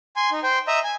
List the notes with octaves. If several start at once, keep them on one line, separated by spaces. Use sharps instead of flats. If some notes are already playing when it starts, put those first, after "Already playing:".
G#5 C6
D#4
C5 G5
D#5 E5 A#5
G#5